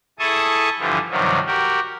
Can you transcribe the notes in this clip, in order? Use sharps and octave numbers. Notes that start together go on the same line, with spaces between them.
E4 G#4 A4 A5 C#6 D#6
G2 D3 E3 F3
G2 C3 D#3 F3 F#3
F#4 G4 A#4